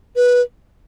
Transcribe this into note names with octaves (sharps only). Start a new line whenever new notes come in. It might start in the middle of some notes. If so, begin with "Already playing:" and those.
B4